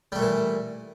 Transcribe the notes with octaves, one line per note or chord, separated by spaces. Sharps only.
A#2 E3 G3 A3